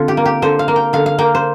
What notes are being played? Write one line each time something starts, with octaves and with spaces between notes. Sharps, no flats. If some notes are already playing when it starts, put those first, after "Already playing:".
Already playing: D3 C4 F4
G4
A#3
G4
D3 C5
F5
A#3
G5
D3 F5
F5
A#3 G5
C5